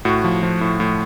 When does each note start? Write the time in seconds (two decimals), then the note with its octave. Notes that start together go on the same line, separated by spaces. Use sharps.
0.05 A2 F#4
0.24 F3
0.43 F3
0.61 A2
0.80 A2